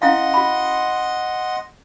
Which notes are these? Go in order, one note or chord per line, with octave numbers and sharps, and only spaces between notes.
C#4 E4 D#5 F5 F#5 C6
F#4 B5